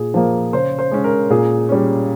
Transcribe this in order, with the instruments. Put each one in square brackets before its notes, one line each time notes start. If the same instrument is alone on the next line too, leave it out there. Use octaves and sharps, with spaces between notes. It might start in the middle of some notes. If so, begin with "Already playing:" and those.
Already playing: [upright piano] A#2 G#4
F3 A#3
C#3 C5
C5
G#3 C#4
A#4
A#2 G#4
G3 C#4